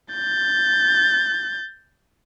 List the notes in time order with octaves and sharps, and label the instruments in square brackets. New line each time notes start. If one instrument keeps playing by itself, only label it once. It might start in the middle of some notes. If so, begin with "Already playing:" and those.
[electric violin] G6 A6